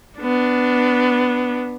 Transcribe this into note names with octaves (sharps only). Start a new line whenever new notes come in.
B3 D4